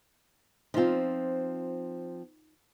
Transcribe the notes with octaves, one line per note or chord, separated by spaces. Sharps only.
F3 C4 D#4 F4